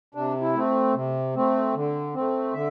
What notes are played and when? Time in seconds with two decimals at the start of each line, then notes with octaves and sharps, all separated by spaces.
0.15 C3 D4
0.41 E4
0.55 A3 C4
0.95 C3
1.35 A3 C4
1.74 D3
2.14 A3 C4
2.54 D3 E5